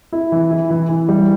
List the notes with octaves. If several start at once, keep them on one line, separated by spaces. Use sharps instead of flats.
E4
E3
E4
E3
E3
G3